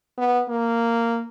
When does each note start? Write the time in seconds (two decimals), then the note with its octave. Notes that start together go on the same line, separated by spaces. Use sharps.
0.18 B3
0.49 A#3